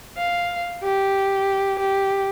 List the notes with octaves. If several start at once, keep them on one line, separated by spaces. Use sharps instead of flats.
F5
G4
G4